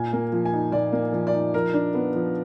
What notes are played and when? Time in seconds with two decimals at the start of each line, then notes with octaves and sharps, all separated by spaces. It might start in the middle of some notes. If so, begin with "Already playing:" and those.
Already playing: A#2 G#5
0.13 A#3
0.32 F3
0.45 G#5
0.53 D#4
0.72 A#2 D5
0.93 A#3
1.13 F3
1.27 D5
1.33 D#4
1.54 F3 A#4
1.74 D4
1.95 B3
2.15 F3